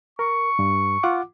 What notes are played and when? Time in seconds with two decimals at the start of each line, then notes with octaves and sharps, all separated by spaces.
0.19 A#4 C#6
0.59 G2
1.03 F4 F#5 D6